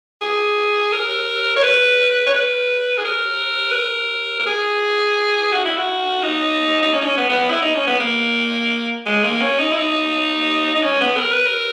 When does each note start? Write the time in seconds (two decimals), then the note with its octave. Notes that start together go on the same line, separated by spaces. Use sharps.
0.22 G#4
0.93 A#4
1.56 C#5
1.63 B4
2.27 C#5
2.34 B4
2.98 G#4
3.05 A#4
3.71 B4
3.75 A#4
4.40 A#4
4.46 G#4
5.52 F#4
5.65 E4
5.78 F#4
6.23 D#4
6.83 D#4
6.94 C#4
7.01 D#4
7.05 C#4
7.17 B3
7.29 B3
7.50 E4
7.62 D#4
7.75 C#4
7.87 B3
8.00 A#3
9.06 G#3
9.24 A#3
9.41 C#4
9.59 D#4
9.71 E4
9.77 D#4
10.75 D#4
10.83 C#4
11.01 B3
11.18 A#4
11.32 B4
11.46 A#4